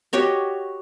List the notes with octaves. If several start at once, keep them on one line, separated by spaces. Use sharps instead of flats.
F#4 G4 C#5 D#5